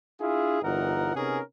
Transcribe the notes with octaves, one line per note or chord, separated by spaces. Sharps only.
D4 E4 F4 G#4
G1 E3 D#4 F4 A#4 F#5
C3 B3 C#4 D#4 G#4 A#4